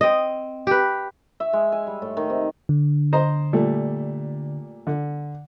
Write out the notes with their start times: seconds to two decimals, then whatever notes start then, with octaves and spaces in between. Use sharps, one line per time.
0.01 C4 D#5
0.67 G4 B4
1.40 E5
1.53 G#3
1.72 G#5
1.87 G3
2.02 A2
2.17 D#3
2.30 C3
2.69 D3
3.13 C5 D#5 A#5
3.53 A#2 G3 A3
4.87 D3